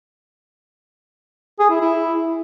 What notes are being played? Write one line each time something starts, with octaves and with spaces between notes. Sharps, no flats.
G#4
E4
E4